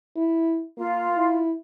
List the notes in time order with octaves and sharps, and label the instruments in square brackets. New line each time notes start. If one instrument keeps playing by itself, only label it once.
[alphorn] E4
[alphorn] A#3 [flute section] F4
[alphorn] E4